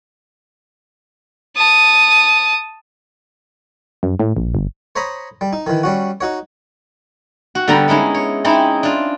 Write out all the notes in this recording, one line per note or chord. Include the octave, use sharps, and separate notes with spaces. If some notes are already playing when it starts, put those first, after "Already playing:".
A5 D#6
F#2
A2
A#1
G1
C5 C#5 A#5 B5 D#6
G3
D#4
D#3 E3
G3 C#4 F#4
D#4 F#4 C#5
F#4
D3 G3 B3 G5 A#5
G#3 C#4 D#4 E4
C#5
C4 C#4 D#4 E4
D4 F4